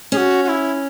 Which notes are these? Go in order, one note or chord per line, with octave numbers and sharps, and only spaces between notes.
C#4 G#4
F#4
F#4
E4